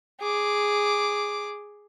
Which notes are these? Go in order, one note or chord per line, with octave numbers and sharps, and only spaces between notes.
G#4 D6